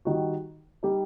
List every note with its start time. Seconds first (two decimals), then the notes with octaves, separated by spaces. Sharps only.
0.05 D#3 G3 D#4 F#4
0.83 G3 D#4 G4